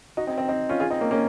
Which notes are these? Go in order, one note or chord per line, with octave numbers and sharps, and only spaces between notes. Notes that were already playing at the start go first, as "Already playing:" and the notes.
D#4 F#4
C4 D#4
C4 D#4
C4 D#4
C#4 F4
F4 G#4
C4 D#4
A#3 C#4
A#3 C#4